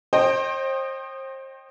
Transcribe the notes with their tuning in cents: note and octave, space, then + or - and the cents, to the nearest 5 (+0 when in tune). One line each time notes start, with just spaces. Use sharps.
C5 +35 D#5 -20 G5 +0